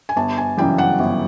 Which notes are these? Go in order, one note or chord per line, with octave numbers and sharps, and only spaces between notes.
G#5
G1 A5
G#5
F#2 C#3 E3 G3 G5
F#5
G1